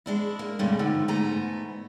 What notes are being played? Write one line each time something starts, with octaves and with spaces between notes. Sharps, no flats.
G#3 D4 E4
A#3
G2 B2 D3 G#3 A3 C#4
A2 D3 D#3 F3
E2 G#2 A3 B3 G#5 A#5